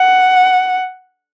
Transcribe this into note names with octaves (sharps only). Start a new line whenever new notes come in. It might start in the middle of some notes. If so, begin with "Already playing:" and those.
Already playing: F#5